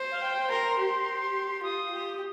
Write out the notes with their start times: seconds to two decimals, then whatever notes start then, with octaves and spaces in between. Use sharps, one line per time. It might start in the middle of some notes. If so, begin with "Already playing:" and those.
Already playing: C5
0.12 F5
0.21 G5
0.50 A#4 C6
0.78 G4
1.63 F4 D#6
1.90 G4